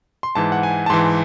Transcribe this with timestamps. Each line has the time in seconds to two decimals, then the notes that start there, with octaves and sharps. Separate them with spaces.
0.23 C6
0.35 G#2 E3 A5
0.52 F#5
0.63 G#5
0.86 A5
0.90 G#2 E3 C6